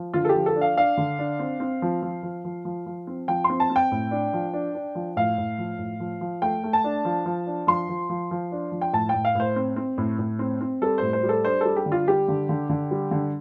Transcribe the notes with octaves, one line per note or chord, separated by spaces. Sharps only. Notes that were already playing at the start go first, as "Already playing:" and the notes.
Already playing: F3
D3 F4
A4
G4
F3
A4
D4
F5
D4 F5
D3
D4
C4
C4
F3
F3
F3
F3
F3
F3
C4
F3 G5
C6
C4
A5
C4
G5
A2
D4
F3
D4
D4
F3
A2 F5
A2
F3
A2
F3
F3
A3 G5
A3
A5
D4
F3
F3
D4
F3 C6
F3
F3
F3
D4
F3
G5
A2 A5
A2 G5
F5
A2 C5
C4
C4
A2
A2
C4
C4
G3 A4
A2 C5
C5
G3
A4
D4 C5
G3 A4
G4
D3
F4
G3 G4
D3
D3
D3
G3
D3